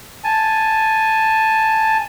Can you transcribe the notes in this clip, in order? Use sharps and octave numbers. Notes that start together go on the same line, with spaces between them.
G#5 A5